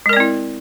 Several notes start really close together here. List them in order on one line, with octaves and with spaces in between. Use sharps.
G#3 A#4 D5 C4 E4